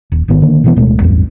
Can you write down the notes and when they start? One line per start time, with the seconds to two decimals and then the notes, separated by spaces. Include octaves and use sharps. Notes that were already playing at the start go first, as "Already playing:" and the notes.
0.12 D#1
0.28 G#1 G#2 D#3 B3
0.42 D3 D#3 A#3
0.64 B2 E3 B3
0.76 D1 B2 G#3 A3
1.00 A1 E2 G2